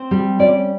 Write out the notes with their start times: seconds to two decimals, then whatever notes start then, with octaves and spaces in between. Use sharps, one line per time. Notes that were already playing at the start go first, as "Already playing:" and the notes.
Already playing: C4
0.11 G3
0.39 C#4 D5